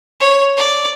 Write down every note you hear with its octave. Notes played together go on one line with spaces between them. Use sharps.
C#5
D5